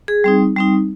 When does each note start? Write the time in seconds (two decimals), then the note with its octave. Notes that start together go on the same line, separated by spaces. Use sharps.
0.08 G#4
0.24 G3 C4 D#4
0.56 G3 C4 D#4